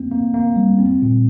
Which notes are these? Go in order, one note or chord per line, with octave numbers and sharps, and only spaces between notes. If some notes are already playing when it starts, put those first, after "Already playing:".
Already playing: A#3 C4
A#3
A#3
G3
C4
A#2